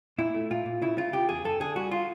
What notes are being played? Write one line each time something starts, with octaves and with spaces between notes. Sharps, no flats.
A#2 E4
A3
A#2 F4
A#2
C#3 E4
C#3 F4
C#3 G4
E2 G#4
F#2 A4
D3 G#4
G3 F#4
F4